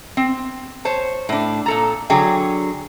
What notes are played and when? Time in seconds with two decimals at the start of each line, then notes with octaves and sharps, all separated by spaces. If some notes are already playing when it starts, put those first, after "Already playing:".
0.17 C4
0.85 C5 C#5 A5
1.29 A2 D4
1.66 A#2 A4 A#5
2.10 D3 F#3 G#4 G5